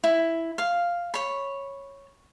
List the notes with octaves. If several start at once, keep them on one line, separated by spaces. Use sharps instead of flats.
E4
F5
C#5 B5